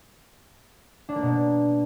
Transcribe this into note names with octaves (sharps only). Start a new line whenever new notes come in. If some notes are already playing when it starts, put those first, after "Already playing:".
D4
A#3
B2